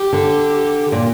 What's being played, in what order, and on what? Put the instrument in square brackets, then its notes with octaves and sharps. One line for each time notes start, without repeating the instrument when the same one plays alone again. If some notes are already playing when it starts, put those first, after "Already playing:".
Already playing: [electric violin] G4
[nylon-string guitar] D3
A#2